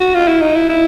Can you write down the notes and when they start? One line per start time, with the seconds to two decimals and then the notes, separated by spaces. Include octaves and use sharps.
0.01 F#4
0.14 F4
0.28 E4
0.41 D#4
0.55 E4
0.69 E4